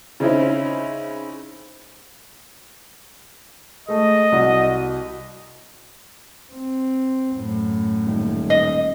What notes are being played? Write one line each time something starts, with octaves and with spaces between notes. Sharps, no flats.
C#3 C4 C#4 D#4 E4 C5
G#3 A3 D#5
C2 F#4
C4
F#2 A2
D#1
D#5